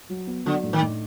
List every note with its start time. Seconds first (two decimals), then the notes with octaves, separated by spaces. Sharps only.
0.09 F#3
0.27 B3
0.45 D3 F#3
0.63 A2
0.73 D#3
0.82 A2